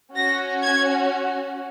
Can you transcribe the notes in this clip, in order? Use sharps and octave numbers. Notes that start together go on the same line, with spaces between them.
C#4 F#4 A#6
G#6